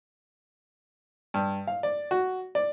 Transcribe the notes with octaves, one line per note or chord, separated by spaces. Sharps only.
G2
F5
D5
F#4
D5